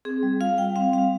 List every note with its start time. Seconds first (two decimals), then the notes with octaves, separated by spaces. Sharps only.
0.05 C4 G#4
0.23 G3
0.40 F4 F5
0.58 G3 G5
0.76 C4 F5
0.93 G3 F5